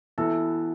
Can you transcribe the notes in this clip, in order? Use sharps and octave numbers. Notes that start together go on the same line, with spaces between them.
E3 B3 E4 F#4 A4